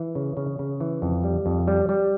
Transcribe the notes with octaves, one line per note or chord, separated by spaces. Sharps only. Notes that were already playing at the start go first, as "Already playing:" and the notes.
Already playing: E3
C#3
C#3
C#3
E3
F2
G3
F2
G3
G3